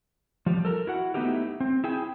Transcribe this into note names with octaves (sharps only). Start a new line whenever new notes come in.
F3 G3
A4 A#4
E4 F#4 F#5
A3 B3 D#4 E4 G4 A#4
C4
E4 G#4 G5